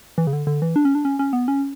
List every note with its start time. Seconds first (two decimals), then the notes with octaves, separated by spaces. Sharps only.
0.18 E3
0.27 C#3
0.33 D3
0.47 D3
0.62 E3
0.76 D4
0.85 C#4
0.95 D4
1.05 C#4
1.19 C#4
1.33 B3
1.48 C#4